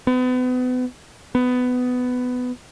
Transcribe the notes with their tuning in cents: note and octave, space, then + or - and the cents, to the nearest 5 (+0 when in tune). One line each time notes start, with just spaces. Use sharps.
B3 +35
B3 +15